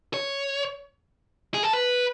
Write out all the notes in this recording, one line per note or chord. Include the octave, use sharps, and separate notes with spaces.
C#5
G#4
A4
B4